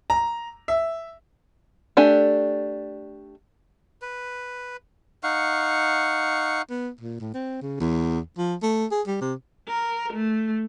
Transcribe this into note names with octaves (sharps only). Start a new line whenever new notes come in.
A#5
E5
A3 D4 G4 G#5
B4
D#4 F5 F#5 C#6
B3
A#2
A2
C4
C#3
E2
F3
A3
G#4
G3
C3
A#4
A3